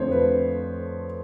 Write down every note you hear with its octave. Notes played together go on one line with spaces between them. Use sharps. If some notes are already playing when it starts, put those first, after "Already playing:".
Already playing: F2 D3 F3 A3 C5 C#5
B4